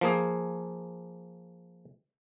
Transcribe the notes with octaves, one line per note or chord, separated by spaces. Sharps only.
F3 A#3 G#4